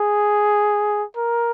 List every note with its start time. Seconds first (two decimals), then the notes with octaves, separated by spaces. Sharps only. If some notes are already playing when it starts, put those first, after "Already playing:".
Already playing: G#4
1.16 A#4